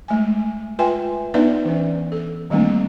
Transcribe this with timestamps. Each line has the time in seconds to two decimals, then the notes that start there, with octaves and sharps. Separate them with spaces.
0.08 G#3 A3 G#5
0.79 F4 B4 E5 G5 G#5
1.34 B3 D4 D#4 B4 D5 E5
1.65 E3 C#4
2.12 A4
2.50 D#3 G3 A3 A#3 C4 D4